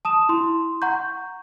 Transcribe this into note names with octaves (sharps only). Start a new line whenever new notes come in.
A5 D#6 E7
E4 C6
F#5 A#5 C#6 G6